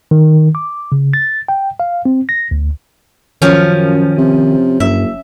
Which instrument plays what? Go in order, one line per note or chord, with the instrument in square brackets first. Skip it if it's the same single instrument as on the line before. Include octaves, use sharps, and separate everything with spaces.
[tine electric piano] D#3
D6
C#3
A6
G5
F5
C4
A#6
D2
[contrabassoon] F#2 [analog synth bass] D#3 [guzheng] F3 C#4
[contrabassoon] C3
[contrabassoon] F#1 [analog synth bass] G2 [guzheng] E5